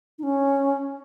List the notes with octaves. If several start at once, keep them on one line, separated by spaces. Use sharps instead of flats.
D#4
C#4